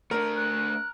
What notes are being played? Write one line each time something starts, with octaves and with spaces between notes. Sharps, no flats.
A3 D4 A#4
F#6